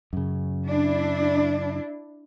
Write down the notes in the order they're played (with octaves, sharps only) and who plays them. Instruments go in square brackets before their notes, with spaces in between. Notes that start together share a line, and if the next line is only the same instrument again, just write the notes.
[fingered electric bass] F#2 C#3
[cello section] D4 E4